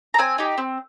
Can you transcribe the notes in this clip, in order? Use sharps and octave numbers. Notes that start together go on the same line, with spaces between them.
A#5
C4 G#5
D#4 G4
C4